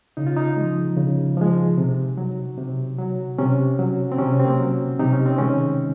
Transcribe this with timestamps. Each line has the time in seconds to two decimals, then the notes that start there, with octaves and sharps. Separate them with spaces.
0.17 C#3 D#4
0.27 F4
0.37 D#4
0.57 F3 G#3
0.97 C#3
1.37 F3 G#3
1.77 C3
2.17 F#3
2.58 C3
2.98 F#3
3.38 C3 C#4
3.79 F#3
4.12 C4
4.18 C3 C#4
4.39 C4
4.45 A#3
4.60 F#3
4.99 C3 D#4
5.13 C#4
5.26 C4
5.39 D#3 G#3 C#4